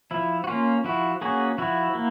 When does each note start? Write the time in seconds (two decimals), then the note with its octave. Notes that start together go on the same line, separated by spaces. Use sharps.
0.11 F3 E4
0.44 F#4
0.47 A#3 C#4 F4
0.84 F3 E4 F#4
1.21 A#3 C#4 F#4 G#4
1.58 F3 E4 F#4
1.95 A#3